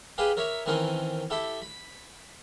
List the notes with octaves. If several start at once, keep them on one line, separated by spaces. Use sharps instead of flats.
G4 G#4 B4 D#5 F5
A#4 C#5 E5 B5 D6
D#3 E3 C4 C#4 A#4 D#5
E4 G4 A4 E5
B5